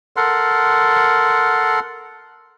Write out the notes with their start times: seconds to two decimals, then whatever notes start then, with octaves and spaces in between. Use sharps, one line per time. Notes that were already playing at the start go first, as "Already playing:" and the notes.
0.16 A4 A#4 F#5 C6